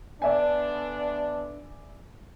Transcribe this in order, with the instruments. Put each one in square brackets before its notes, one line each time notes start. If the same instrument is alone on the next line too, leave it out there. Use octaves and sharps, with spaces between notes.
[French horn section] D3 B3 D4 [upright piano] D5 E5 G#5